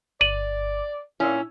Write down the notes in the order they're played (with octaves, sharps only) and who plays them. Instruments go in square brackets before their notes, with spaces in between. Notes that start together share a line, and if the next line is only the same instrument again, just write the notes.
[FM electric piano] G1 [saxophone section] D5 [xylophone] D#7 F#7
[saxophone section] A#2 [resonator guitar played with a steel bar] C#4 [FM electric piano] E4 E6